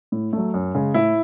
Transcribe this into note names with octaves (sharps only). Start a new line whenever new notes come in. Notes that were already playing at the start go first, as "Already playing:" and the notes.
A2
F#3 A3
F#2
C#3 G#3
A2 E4